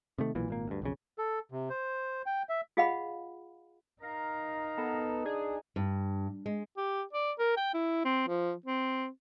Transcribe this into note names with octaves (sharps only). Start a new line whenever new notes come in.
C3 D#3 A3
B1 A#2 E3
G#1 A#2 A#3
D2 G2
B1 F2 C#3
A4
C3
C5
G5
E5
F4 G#4 D#5 F5 F#5 B5
D#4 A#4 F5 A#5
B3 A4
D4 G#4
G2
G#3
G4
D5
A#4
G5
E4
C4
F3
C4